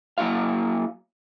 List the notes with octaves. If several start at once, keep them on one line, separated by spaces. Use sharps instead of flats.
F#3 A#3 C#4 E4 F#4 F5